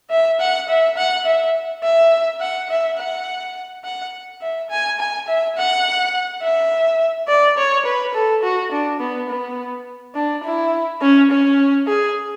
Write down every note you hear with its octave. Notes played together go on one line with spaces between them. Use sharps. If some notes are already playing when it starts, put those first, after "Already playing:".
E5
F#5
E5
F#5
E5
E5
F#5
E5
F#5
F#5
E5
G#5
G#5
E5
F#5
E5
D5
C#5
B4
A4
F#4
D4
B3
B3
D4
E4
C#4
C#4
G#4